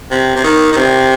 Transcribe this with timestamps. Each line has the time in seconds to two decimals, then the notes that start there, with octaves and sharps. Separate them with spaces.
0.11 C3
0.36 C3
0.44 D#3
0.72 D#3
0.76 C3